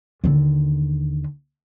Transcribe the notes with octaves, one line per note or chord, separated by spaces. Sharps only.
D#2 D3